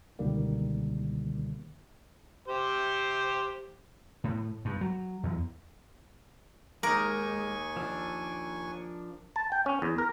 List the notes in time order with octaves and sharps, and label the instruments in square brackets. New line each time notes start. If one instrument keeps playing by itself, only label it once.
[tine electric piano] C#2 B2 D3 D#3 G3 A#3
[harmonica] G4 C5
[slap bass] A2
G2
F#3
E2
[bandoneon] D#2 G#5 C#6 [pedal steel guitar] G#3 [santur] A#3 D#4 [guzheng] A#4
[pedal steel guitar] F3 D4 [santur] E6
[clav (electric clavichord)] A5
G5
C#4
E2
A#4